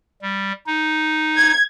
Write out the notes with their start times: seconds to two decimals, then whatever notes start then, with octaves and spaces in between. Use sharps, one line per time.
0.22 G3
0.67 D#4
1.36 G#6